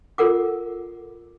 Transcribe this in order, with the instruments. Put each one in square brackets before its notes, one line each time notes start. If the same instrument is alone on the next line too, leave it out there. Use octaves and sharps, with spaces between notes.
[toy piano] F4 A4 A#4 F#5 D6